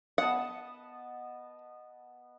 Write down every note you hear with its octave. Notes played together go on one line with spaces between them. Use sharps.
B3 D#5 F#5 A5